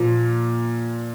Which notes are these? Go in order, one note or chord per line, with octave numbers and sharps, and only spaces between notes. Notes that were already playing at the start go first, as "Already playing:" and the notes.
Already playing: A#2 F3